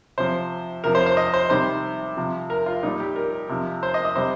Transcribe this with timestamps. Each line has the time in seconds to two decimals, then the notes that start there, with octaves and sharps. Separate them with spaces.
0.18 C3 F3 C5
0.84 C3 F3 A#4
0.95 C5
1.06 C5
1.17 D#5
1.33 C5
1.50 C3 D#3 G3 C5
2.17 C3 F3
2.50 A#4
2.66 F4
2.83 A#2 G3 D#4
3.00 G4
3.16 A#4
3.49 C3 F3
3.83 C5
3.94 D#5
4.05 D#5
4.16 C3 G3 C5